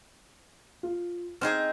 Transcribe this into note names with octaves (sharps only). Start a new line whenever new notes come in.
F4
C4 D#4 G#4 F6